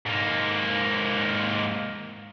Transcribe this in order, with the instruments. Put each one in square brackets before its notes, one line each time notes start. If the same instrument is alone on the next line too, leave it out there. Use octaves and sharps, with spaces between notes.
[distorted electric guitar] G#2 A#3